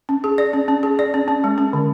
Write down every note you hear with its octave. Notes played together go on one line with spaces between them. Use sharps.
C#4
G#4
D5
C#4
C#4
G#4
D5
C#4
C#4
G#3
C#4
D3